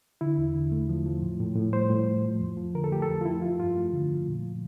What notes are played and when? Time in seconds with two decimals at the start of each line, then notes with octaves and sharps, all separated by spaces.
0.21 D3 E4
0.38 E2
0.55 D3
0.72 A3
0.89 F3
1.06 F3
1.22 A2
1.40 A2
1.56 A2
1.73 G3 C5
1.90 A2
2.07 A2
2.24 F3
2.41 F2
2.57 F3
2.75 D3 A#4
2.84 A4
2.91 A3 G4
3.02 A4
3.08 F2
3.21 F4
3.25 F3 E4
3.42 F3 F4
3.59 G2 F4
3.76 A3
3.93 D3
4.10 F3
4.27 A#2
4.43 F3